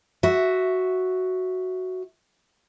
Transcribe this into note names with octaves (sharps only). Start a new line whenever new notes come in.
F#4 E5